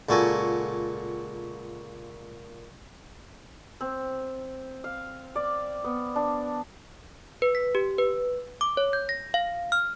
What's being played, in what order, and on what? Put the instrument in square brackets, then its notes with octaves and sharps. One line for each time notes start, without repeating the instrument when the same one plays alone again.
[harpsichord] C#2 A#2 F#4 A4 G#5 A#5
[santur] C4
F5
D5
B3
D4
[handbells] B4
B6
G4
B4
D6
C#5
G6
A#6
F5
F6